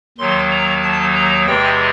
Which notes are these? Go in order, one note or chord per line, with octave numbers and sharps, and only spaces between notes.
D#2 D#3 F#3 C6
A#5
A5
A#5
E2 C3 E3 G#3 G5